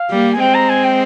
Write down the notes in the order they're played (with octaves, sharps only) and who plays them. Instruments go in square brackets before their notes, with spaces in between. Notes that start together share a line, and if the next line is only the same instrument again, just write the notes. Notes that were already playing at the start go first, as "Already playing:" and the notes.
Already playing: [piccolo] F5
[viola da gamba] G3 A#3
[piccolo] G#5
[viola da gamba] G#3 C4 [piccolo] G5
[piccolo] A#5
G#5
G5